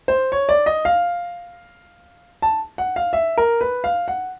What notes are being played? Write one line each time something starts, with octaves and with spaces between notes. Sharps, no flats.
C5
C#5
D5
D#5
F5
A5
F#5
F5
E5
A#4
B4
F5
F#5